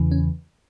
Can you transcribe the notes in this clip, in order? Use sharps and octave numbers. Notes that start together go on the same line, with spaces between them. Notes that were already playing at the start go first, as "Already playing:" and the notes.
Already playing: E2 C#3 E3
C#4